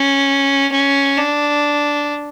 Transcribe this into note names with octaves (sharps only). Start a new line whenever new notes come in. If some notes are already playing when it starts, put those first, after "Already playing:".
Already playing: C#4
C#4
D4